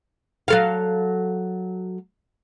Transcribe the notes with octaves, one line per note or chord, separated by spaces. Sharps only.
F#3 A4 F5